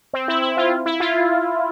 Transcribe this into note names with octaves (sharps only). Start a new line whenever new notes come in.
C4
E4
E4
F4
E4
F4